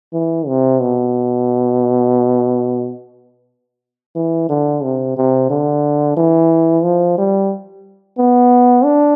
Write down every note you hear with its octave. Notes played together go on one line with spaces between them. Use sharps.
E3
C3
B2
E3
D3
C3
C3
D3
E3
F3
G3
B3
D4